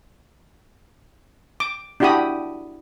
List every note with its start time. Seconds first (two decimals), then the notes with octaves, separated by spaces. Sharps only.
1.60 D6
2.00 D4 E4 F#4 G4 B5 D#6